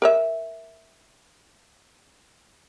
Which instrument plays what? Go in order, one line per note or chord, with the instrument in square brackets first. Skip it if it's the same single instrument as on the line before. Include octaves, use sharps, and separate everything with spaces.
[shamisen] A#4 C#5 E5